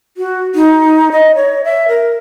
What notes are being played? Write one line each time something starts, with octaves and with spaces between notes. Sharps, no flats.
F#4
D#4
D#5
C#5
E5
A#4